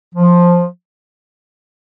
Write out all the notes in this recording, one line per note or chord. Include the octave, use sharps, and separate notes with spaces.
F3